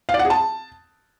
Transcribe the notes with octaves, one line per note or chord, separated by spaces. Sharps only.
F5
D5
F#5
G#4
A5